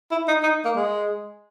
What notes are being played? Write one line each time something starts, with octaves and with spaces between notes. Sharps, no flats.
E4
D#4
D#4
A#3
G#3